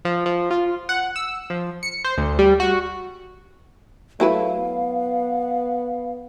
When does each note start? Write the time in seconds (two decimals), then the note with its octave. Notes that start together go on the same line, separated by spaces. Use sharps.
0.05 F3
0.26 F3
0.51 F4
0.89 F#5
1.16 E6
1.50 F3
1.83 C#7
2.04 C5
2.17 D2
2.39 G3
2.60 F#4
4.20 F#3 A3 E4 B4 F5
4.59 B3